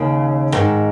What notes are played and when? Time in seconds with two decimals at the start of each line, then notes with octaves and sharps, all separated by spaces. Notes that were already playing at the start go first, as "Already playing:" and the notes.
Already playing: D#2 C#3
0.55 G#2 D#3